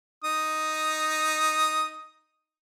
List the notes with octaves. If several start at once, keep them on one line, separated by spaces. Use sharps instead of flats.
D#4 D#6